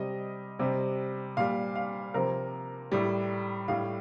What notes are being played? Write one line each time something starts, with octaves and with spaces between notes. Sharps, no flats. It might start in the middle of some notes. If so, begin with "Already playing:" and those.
Already playing: C3 G3 D#5
C3 G3
A#2 G3 F5
F5
C3 F3 A#4
A2 G3
A2 G3 F5